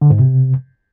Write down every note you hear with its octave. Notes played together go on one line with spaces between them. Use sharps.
D3
G#2
C3